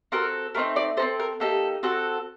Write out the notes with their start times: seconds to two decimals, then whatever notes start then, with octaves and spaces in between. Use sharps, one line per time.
0.12 C4 F#4 A4 A#4
0.55 A3 C4 D#4 A#4
0.76 D5
0.97 D#4 A4 C5
1.02 C4
1.20 A#4
1.40 A#3 D#4 G4 A4
1.83 C4 F#4 A4